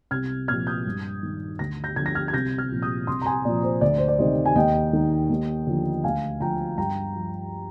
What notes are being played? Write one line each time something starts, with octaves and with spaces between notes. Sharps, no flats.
C2 F6 G#6
A#2 F3 F6 G#6
D#6 G6
G2
D#3
D2 A#6
G6 A#6
D3 F3 G#6
A#6
F6 G#6
G#6
C2 G6 A#6
F6 G#6
A#2 F3
D#6 G6
C2 C6 D#6
A#5
G#5 C6
A#2 F3 D5
C5
D2 D5
C5
D5
C3 D#3 C5 D#5
G#5
D#2 D#5 G5
D#3
D#2
D3 F3
D2 F5 G#5
D3 F3 G5 A#5
G2 G5 A#5
F3